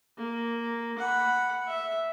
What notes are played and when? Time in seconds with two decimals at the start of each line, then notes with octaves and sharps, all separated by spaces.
0.18 A#3
0.99 F#5 B5
1.68 E5